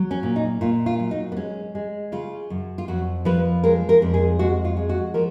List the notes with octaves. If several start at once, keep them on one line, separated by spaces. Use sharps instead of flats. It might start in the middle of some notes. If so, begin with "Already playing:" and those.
Already playing: F#3
C#4
A#2
D#4
A#2 F4
F4
F#3
D#4
B3
G#3 C#4
G#3
C#3 F4
F#2
F4
F2 F#4
F3 B4
G#3 A#4
A#4
F2
G#4
G#3 F#4
F4
G#3
F#4
F3 A#4